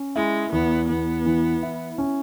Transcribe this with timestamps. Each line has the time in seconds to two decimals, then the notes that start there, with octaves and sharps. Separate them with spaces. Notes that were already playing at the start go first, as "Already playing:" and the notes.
Already playing: C#4
0.15 G#3 E4
0.52 E2 B3
0.88 E2 B3
1.26 E3
1.63 E4
1.98 C#4